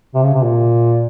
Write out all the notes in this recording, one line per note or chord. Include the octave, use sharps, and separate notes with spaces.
C3
C#3
C3
A#2